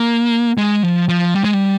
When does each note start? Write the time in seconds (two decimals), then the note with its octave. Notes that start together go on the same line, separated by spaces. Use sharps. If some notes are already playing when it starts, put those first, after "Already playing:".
Already playing: A#3
0.58 G#3
0.83 F3
1.09 F3
1.34 G3
1.44 G#3
1.54 G3